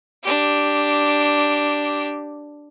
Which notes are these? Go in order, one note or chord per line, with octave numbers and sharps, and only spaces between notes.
D4 G4